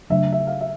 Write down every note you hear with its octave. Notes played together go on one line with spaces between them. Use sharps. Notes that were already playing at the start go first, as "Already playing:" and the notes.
C#3 F#3 A3 D4 E5
E5
F5
E5